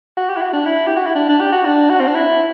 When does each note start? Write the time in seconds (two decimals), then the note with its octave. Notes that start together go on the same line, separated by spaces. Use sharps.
0.17 F#4
0.29 G4
0.37 E4
0.42 F#4
0.53 D4
0.66 E4
0.87 G4
0.96 F#4
1.07 E4
1.15 D4
1.29 D4
1.41 G4
1.52 F#4
1.65 D4
1.90 F#4
2.00 C4
2.08 D4
2.15 E4